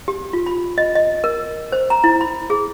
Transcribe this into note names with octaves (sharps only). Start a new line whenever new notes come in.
G4
F4
B5
D#5
D#5
A#4
C5
A#5
E4
B5
G#4